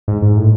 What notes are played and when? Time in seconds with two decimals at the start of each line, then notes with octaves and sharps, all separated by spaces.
0.08 G#2
0.22 G#2
0.37 A2